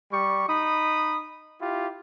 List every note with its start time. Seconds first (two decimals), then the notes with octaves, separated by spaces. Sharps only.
0.11 G3 G4 C#6
0.48 D#4 B5 D#6
1.60 E4 F4 G4